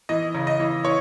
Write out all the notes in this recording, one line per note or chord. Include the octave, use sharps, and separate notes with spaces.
E3 D#5
C#3
D#5
E3
E3 C#5